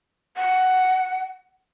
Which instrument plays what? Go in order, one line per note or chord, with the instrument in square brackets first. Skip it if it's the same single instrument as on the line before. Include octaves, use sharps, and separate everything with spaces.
[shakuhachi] F#5